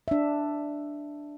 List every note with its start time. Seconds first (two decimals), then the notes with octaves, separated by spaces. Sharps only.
0.08 D4 E5